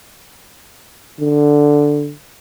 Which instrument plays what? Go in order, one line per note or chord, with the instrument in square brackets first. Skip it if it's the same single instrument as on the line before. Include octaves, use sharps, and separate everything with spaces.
[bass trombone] D3